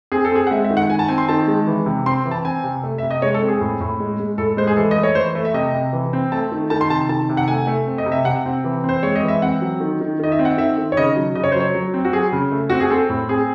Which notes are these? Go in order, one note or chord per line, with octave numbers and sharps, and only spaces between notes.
C4 G#4
A4
C4 G#4
F#5
G#3 E5
E5
D#3
F#5
D#3 G#5
A5
C4 G#5
C6
D#3 A5
G#3
E3
C3
C4 C6
E3
A5
C4 G#5
C3
A3
C3 E5
D#5
G#3 C#5
A4
C4
G#4
A2
A2
G#3
G#3
A2 A4
G#3 C5
G#4
E3 A4
A3 D#5
C#5
E3 C5
A3
E5
C3 D#5
C3
E3
C4
A3 A5
D#3
D#3 A5
C6
C3 A5
D#3 A5
C3
F#5
A3 G#5
A3
C4
D#5
C3
E5
C3 F#5
C4
E3
C4
C5
G#3 C#5
D#5
E3
E5
C4 F#5
F#3
D#3
D#3
D#3 D#5
E5
C4
F#5
D#3 E5
D#3
C#5
C#3 D#5
F#3
C#3 D#5
C#5
C5
F#3 C#5
F#3
C4
F#4
F#3 G#4
C#3
A3
C4 F#4
G#4
C4 A4
A2
C4 G#4